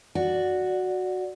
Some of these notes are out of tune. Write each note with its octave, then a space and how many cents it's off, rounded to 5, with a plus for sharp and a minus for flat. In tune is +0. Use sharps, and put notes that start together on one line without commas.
F#4 -5 D5 +0